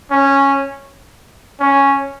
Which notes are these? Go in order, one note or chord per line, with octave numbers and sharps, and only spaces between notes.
C#4
C#4